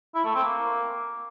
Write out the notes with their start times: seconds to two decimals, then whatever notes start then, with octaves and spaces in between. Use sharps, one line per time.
0.15 E4
0.25 A3
0.35 C4
0.45 A#3